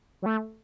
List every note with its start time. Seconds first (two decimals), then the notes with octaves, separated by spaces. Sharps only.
0.22 F#3
0.26 A3